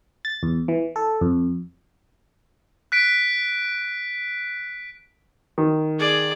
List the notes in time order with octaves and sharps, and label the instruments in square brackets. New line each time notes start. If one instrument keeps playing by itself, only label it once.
[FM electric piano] A6
E2
E3
A4
F2
[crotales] F#6 B6 D7
[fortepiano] D#3
[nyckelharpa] G#4 D5